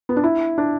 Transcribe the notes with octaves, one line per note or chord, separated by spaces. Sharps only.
B3
D4
E4
D4